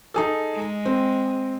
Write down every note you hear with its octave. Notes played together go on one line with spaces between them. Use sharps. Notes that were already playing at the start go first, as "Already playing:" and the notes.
D#4 G#4 A4
G#3
C4